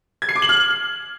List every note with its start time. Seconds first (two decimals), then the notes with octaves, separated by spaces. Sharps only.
0.22 G#6
0.29 C7
0.35 D6
0.42 F#7
0.49 F6